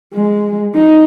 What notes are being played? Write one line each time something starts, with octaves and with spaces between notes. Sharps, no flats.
G#3
D#4